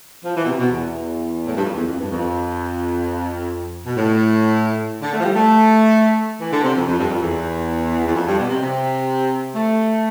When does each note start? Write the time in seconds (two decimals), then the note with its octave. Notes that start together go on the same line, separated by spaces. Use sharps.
0.24 F3
0.36 E3
0.43 B2
0.46 C3
0.58 B2
0.70 E2
1.47 A2
1.56 G2
1.63 F2
1.74 E2
1.87 F2
1.99 G2
2.10 F2
3.86 B2
3.96 A2
5.01 D3
5.12 A3
5.20 F3
5.23 G3
5.35 A3
6.40 E3
6.51 D3
6.63 C3
6.76 F2
6.87 F2
6.98 G2
7.09 F2
7.22 E2
8.06 E2
8.14 F2
8.26 G2
8.38 B2
8.49 C3
8.61 C3
9.55 A3